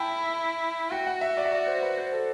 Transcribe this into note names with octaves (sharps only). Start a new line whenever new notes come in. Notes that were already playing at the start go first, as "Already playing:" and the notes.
Already playing: E4 G5 A5
F#4 G5
F#5
E5
D5
E5
D5
C5
B4
C5
A4